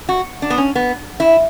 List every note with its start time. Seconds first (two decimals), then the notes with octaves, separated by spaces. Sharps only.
0.09 F#4
0.42 D4
0.50 B3
0.58 C#4
0.75 B3
1.20 E4